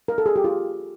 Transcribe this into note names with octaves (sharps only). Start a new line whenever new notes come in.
A#4
A4
G#4
G4
F4